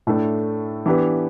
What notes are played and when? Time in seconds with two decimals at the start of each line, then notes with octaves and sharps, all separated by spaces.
0.07 A2 A3 D4 A4
0.86 E3 B3 D4 G4 B4